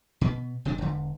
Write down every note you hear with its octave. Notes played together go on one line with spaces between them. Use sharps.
B2 B3
F#1 C3 D#3 D4
E1 D3